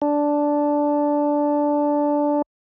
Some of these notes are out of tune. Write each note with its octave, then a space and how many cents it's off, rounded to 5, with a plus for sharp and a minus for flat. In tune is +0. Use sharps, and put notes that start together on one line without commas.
D4 -5